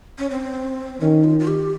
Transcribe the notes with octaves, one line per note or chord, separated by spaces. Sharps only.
C#4
C4
D#3 C#4
F4
F4
G4